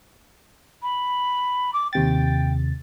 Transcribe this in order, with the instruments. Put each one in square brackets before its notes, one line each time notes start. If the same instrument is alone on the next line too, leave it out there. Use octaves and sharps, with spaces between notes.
[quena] B5
D6
[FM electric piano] D#2 C3 A6 [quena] G5